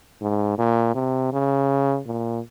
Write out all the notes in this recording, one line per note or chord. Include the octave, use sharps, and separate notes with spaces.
G#2
A#2
C3
C#3
A#2